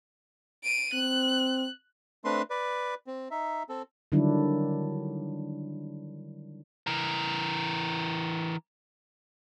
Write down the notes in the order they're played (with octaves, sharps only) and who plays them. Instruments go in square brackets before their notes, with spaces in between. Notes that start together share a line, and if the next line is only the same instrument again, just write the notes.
[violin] D7 D#7
[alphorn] C4 [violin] F#6
[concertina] A3 C4 D4 B4 C6
B4 D5
C4
D#4 E5
C4 A4
[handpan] D3 D#3 F#3 G3 D4 E4
[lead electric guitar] E3 A#4